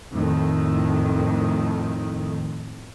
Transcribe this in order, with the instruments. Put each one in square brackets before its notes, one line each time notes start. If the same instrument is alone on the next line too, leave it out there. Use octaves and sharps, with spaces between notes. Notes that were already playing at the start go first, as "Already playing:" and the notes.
[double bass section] F2 A2 D#3